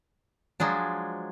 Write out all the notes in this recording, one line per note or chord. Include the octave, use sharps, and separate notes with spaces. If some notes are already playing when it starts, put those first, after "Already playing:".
F3 F#3 G#3 D4